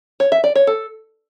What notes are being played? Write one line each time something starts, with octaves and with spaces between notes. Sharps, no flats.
C#5
E5
D5
C#5
A4